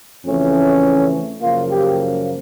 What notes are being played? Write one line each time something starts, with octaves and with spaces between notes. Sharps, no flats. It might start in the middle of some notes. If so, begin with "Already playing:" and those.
F2 C#3 E3 A3 C#4
F#2 C#3 F3 A#3 F4
G4